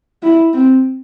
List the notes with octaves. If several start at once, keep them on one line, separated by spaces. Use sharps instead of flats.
E4
C4